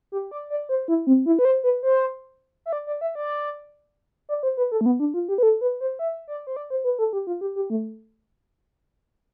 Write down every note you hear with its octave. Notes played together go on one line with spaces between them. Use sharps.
G4
D5
D5
C5
E4
C4
E4
B4
C5
B4
C5
E5
D5
D5
E5
D5
D5
C5
B4
A4
A3
B3
D4
F4
G4
B4
A4
B4
C5
E5
D5
C5
D5
C5
B4
A4
G4
F4
G4
G4
A3